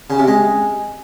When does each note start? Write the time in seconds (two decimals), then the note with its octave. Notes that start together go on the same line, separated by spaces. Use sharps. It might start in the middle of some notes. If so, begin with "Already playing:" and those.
0.10 C#3
0.19 C3
0.28 G#3